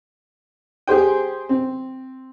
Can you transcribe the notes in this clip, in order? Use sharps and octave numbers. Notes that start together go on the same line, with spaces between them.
G4 G#4 C5 G5
C4